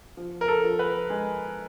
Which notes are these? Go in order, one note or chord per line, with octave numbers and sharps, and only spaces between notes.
F3
A#4
A4
F3
B4
G#3